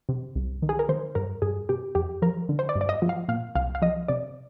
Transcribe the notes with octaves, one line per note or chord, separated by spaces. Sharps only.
C3
C2
D#3
G#4
A#4
D#3 C5
G2 A#4
G2 G#4
C3 G4
F2 G4
F3 A#4
D3
C5
D5
G2
D5
D#5
F3
F5
A#2 F5
C2 F5
F5
F3 D#5
C3 D5